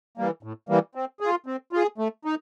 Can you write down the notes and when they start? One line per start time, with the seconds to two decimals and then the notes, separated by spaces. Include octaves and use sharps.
0.18 E3 G3 A#3
0.43 A2
0.69 E3 G3 A#3
0.95 C4
1.20 G#4
1.25 F4
1.46 C4
1.73 F4 G#4
1.98 A3
2.25 D#4